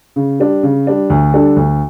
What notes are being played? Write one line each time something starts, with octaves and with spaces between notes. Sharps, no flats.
C#3
G3 D4
C#3
G3 D4
D2
D3 G3 D4 A4
D2